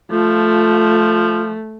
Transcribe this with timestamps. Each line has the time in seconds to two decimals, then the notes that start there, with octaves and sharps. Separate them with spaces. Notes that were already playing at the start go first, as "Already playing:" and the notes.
0.11 F3 A3 F4